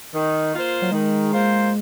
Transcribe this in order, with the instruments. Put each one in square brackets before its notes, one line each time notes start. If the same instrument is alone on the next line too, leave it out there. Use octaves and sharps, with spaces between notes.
[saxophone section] D#3
A#3 F4 C5
[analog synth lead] F#3
[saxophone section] D#3 [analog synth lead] G#3
[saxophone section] A#3 F4 C5